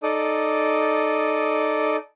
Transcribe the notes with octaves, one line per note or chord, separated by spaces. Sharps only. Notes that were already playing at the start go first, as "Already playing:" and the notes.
D#4 A4 D5 D#6